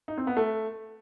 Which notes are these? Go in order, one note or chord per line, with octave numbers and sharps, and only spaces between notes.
D#4
C4
B3
A3